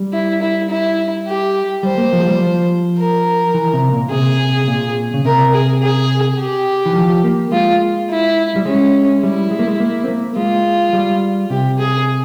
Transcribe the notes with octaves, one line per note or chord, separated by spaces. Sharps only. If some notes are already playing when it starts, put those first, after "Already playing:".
Already playing: G3
E4
E4
E4
G4
G3 C5
A#3
F3
G#3
G3
F3
A#4
E3
C3
A#2
C3 G#4
A#2
C#3
C3 A#4
G#4
G#4
G4
E3
F3
A#3
G#3 F4
E4
G3
G#3 C#4
G3 E4
G#3
A#3
G#3
A#3
C4
A#3
G#3 F4
G3
C3 G4
G#4